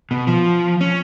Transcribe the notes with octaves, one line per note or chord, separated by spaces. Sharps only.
B2
F3
C#4